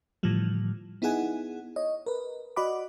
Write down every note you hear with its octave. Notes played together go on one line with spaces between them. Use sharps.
A2 D3 E3 F3 G3
B3 D#4 E4 G#4 F#5 G#5
C#5 D#5
A#4 B4
F#4 D5 D#5 F#5 B5 D6